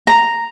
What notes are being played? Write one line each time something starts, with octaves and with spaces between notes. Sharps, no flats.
A#5